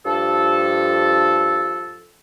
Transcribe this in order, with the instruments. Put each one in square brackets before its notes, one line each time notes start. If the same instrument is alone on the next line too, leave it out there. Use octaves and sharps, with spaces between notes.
[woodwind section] G2 F3 A4